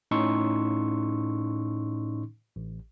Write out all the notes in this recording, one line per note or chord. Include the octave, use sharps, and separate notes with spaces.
A2 C#4 D#4 C6 C#6 E6
A1